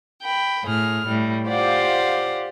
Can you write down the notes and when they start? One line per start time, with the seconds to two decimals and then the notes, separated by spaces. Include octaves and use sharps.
0.22 G5 B5
0.65 A2 G#4 F6
1.07 A2 G3
1.47 F4 G4 C5 D5 F5 F#5